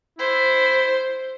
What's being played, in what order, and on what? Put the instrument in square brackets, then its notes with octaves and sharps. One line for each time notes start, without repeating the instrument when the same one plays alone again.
[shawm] E4 [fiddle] C5